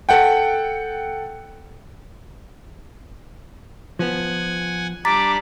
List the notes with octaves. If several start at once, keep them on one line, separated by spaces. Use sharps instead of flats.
A4 F#5 G5
F3 B3 F#5 G#5
G3 D4 D5 A#5 D6 A6 B6